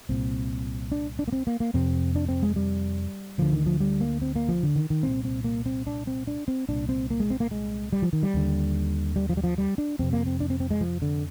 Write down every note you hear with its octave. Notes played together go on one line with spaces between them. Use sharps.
C2 A#2 C4
D4
D4
A#3
C4
A#3
A#3
F2 C3 C4
D4
C4
G#3
G3
D2 D3 F3
D#3
F3
G3
A#3
C4
A#3
F3
D3
D#3
D#3
C2 A#2 C4
C4
A#3
C4
D4
C4
D4
C4
C2 A#2 D4
C4
A#3
G#3
C4
A#3
G#3
G3
F3
D#3
G3
D#2 D3
G3
F3
G3
F3
G3
D4
F2 C3 C4
A#3
C4
D4
C4
C4
G#3
F3
D3